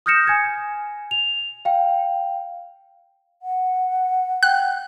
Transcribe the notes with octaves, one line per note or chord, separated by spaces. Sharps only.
D#6 F6 G6 A#6 C#7 E7
G#5 G#6
F7
F5 G5
F#5
G5 F#6